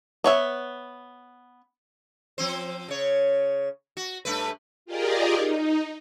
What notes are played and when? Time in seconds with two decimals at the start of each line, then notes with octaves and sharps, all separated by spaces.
0.24 B3 C#5 E5
2.38 F3 C4 C5
2.88 C#3 C#5
3.97 F#4
4.25 G2 A3 B4
4.86 F4 G4 G#4 A#4 D5 D#5
5.35 D#4